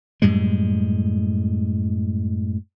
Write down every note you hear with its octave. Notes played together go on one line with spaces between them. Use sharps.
F#2 A2 G3 G#3